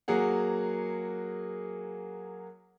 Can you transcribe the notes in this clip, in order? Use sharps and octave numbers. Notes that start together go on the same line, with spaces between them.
F#3 A#3 G#4 F#5